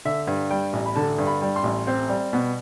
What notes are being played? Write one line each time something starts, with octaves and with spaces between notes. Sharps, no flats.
D3 E5
G2
G3 G5
A1
B5
D3 A5
G2
B5
G3
C6
A1
C4
G3
B2